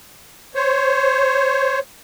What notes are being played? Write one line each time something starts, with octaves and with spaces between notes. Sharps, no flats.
C5 C#5